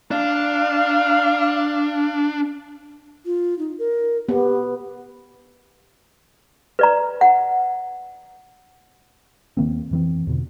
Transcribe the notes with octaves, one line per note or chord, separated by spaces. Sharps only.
D4 F5
F4
D#4
A#4
B3 G4
B4 D5 A#5
F#5
D#2 D#3 A#3 C4
F2 E3 C4
E2 B2 D3